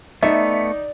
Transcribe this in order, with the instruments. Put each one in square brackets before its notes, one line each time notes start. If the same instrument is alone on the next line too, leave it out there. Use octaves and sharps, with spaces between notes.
[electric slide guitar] A3 B3 [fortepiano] D#4 [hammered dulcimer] D5 [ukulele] E5